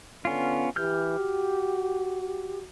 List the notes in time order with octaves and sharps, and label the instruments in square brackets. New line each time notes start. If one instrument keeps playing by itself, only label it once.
[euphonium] D3 [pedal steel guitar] B3 C#4 F4
[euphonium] E3 [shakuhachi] G4 [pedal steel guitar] F6 G6
[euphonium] F#4